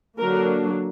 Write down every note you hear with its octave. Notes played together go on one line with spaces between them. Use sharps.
D3 F#3 A#3 D4 A#4